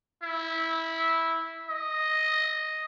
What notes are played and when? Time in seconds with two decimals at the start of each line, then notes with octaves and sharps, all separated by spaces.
0.23 E4
1.68 D#5